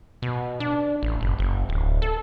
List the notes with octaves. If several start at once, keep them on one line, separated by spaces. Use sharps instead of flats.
B2
D4
A1
F#1
F#1
D1
A4